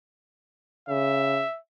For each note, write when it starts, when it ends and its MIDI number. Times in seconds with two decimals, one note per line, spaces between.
0.89 1.43 49
0.89 1.58 76